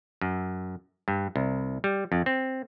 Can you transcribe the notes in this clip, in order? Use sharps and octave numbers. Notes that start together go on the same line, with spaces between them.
F#2
G2
C2
G3
F2
C4